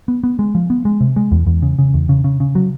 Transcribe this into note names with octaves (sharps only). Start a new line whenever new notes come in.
B3
B3
G#3
F3
B3
G#3
C3
G#3
E2
E2
C#3
C#3
E2
C#3
C#3
C#3
F#3